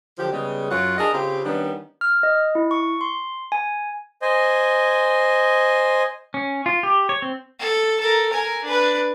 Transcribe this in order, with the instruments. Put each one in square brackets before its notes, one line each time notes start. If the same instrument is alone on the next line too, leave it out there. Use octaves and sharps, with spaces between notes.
[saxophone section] D3 F3 F#3 G4
C#3 G3 G#3 B3 C#4
F#2 F4 F#4 C#5 F#5
D4 G#4 A#4 D#5
C#3 C4 F4 G4
D#3 G3 B3 C#4 D4
[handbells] F6
D#5
E4
C#6
C6
G#5
[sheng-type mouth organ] C5 D#5 G#5
[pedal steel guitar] C#4
F4
G4
C#5
C4
[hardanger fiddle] A4
A4 A#4
A#4 G#5
D4 B4